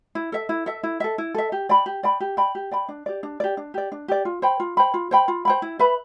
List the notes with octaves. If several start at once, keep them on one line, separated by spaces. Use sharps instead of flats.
E4
A4 E5
E4
A4 E5
E4
A4 E5
E4
A4 E5
G4
D5 G5 B5
G4
D5 G5 B5
G4
D5 G5 B5
G4
D5 G5 B5
D4
G4 D5
D4
G4 D5
D4
G4 D5
D4
G4 D5
F4
C5 G5 B5
F4
C5 G5 B5
F4
C5 G5 B5
F4
C5 G5 B5
E4
B4 E5 B5